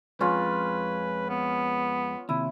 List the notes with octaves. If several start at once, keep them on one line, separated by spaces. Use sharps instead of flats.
F2 G#3 C#4 F4 B4
B3
D#2 C3 E4